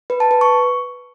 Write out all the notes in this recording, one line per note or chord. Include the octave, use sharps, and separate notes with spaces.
B4
A5
B4
C#6